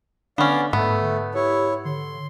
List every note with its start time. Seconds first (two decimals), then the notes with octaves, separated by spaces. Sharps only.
0.38 D3 B3 C#4 D4 D5 F5
0.73 G#2 A3 B3
1.35 E4 G4 C#5
1.85 D3 C6